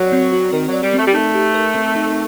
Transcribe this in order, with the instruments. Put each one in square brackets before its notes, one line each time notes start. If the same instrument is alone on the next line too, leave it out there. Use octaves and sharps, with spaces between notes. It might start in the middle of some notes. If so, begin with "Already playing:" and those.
Already playing: [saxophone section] F#3 [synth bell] C4 F#4 A#4 D5
[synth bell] C4
F#4
[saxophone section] D#3 [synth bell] A#4
[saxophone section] F#3 [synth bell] D5
[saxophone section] G3
[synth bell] C4
[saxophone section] A3
G3
[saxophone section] A3 [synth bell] D#4
[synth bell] G4
A#4
C4
D#4